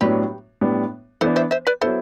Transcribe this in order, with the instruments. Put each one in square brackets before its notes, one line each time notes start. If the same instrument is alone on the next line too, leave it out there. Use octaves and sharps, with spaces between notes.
[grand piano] A2 F#3 B3 D4 [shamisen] G4 B4
[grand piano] A2 G3 B3 D4
[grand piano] E3 B3 D4 [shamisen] A4 C5
[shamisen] C5 E5
C5 E5
B4 D5
[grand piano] F#3 B3 E4 [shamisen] A4 C5